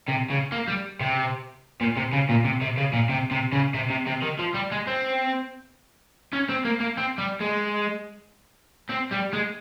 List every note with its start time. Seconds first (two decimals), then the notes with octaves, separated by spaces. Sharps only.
0.09 C3
0.30 C#3
0.52 A#3
0.68 G3
1.01 C3
1.81 A#2
1.97 C3
2.13 C#3
2.29 A#2
2.45 C3
2.61 C3
2.77 C#3
2.93 A#2
3.09 C3
3.31 C3
3.52 C#3
3.74 C3
3.90 C3
4.07 C3
4.22 D#3
4.39 F3
4.54 G3
4.72 G#3
4.87 C4
6.33 C#4
6.49 C4
6.65 A#3
6.80 A#3
6.97 C4
7.18 G3
7.40 G#3
8.90 C4
9.12 G3
9.33 G#3